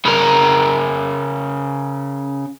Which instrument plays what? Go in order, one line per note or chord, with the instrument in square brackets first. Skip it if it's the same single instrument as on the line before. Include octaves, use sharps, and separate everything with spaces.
[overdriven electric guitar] C#3 A#4